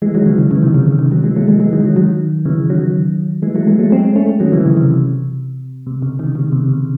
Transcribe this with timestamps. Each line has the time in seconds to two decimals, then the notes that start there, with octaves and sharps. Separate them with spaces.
0.02 E3 G#3
0.15 D#3 F#3
0.26 C#3 E3
0.39 C#3
0.51 C#3 E3
0.63 C3 D#3
0.74 C#3
0.88 C#3
0.99 C3 D#3
1.11 D#3 F#3
1.24 E3 G#3
1.36 F#3 A3
1.48 E3 G#3
1.60 E3 G#3
1.73 D#3 F#3
1.85 D#3 F#3
1.96 D#3 F#3
2.45 C#3 E3
2.70 D#3 F#3
3.42 E3 G#3
3.55 F#3 A3
3.67 E3 G#3
3.79 F#3 A3
3.92 G#3 C4
4.15 A3 C#4
4.40 D#3 F#3
4.52 C#3 E3
4.65 C#3
4.77 C3
5.87 C3
6.02 C#3
6.19 C3 D#3
6.35 C#3
6.52 C3
6.68 C#3